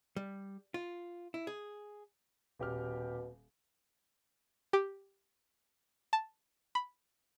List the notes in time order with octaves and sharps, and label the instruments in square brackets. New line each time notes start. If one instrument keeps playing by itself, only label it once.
[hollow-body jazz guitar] G3
F4
E4
G#4
[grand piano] D#1 G4 F6 [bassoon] B2
[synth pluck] G4
A5
B5